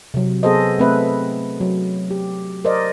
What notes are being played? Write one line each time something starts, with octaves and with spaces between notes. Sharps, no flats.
C3 F#3
B3 G#4 A4 C5 D#5
A3 C4 B4 E5
F#3
G4
A#4 C5 D5 D#5